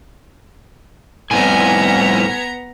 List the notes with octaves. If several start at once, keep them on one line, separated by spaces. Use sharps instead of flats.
C2 A2 B3 G#5 A#5